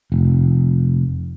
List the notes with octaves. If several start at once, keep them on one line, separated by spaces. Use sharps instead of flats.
F1